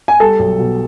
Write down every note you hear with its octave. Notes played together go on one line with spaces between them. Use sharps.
G#5
G3 A4 A5
B1
B2